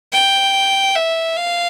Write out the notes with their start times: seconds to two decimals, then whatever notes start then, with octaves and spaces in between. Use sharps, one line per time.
0.13 G5
0.96 E5
1.37 F5